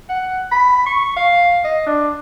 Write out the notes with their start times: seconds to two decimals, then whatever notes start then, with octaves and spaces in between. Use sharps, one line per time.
0.09 F#5
0.51 B5
0.86 C#6
1.16 F5
1.64 D#5
1.86 D4